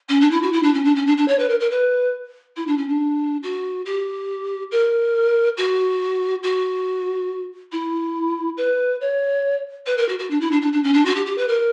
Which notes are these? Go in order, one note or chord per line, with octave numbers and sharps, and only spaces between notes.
C#4
D4
E4
F#4
E4
D4
C#4
D4
C#4
D4
D4
C#5
B4
A#4
A#4
B4
E4
D4
C#4
D4
F#4
G4
A#4
F#4
F#4
E4
B4
C#5
B4
A#4
F#4
F#4
D4
E4
D4
D4
D4
C#4
D4
F#4
G4
G4
B4
A#4